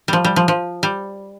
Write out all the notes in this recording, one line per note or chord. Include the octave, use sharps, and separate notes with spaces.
F3 G3
G3
F3
F3
G3